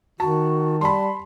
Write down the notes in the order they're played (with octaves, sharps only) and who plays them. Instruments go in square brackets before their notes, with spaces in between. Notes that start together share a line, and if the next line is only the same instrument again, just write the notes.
[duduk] D#3 [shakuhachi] F#4 [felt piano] A5
[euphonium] G3 [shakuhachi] A5 [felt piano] B5 C6